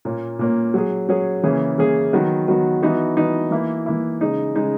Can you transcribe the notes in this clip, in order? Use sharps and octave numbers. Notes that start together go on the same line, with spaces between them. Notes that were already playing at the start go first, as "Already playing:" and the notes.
A#2 A#3 C#4
A#2 A#3 C#4
F#3 C#4 G#4
F#3 C#4 G#4
C#3 E3 A#3 C#4 G#4
C#3 E3 A#3 C#4 G#4
D#3 F#3 B3 F#4
D#3 F#3 B3 F#4
E3 B3 D#4 F#4
E3 B3 D#4 F#4
E3 A#3 E4
E3 A#3 E4
C#3 G#3 D#4
C#3 G#3 D#4